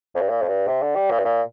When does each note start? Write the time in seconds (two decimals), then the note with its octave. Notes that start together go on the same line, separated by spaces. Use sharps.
0.15 F2
0.21 G2
0.29 A#2
0.42 F2
0.48 G2
0.67 C3
0.82 D3
0.95 G3
1.10 A#2
1.19 G2
1.24 A#2